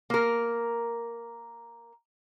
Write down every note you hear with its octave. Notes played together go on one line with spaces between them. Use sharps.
A#3 A#4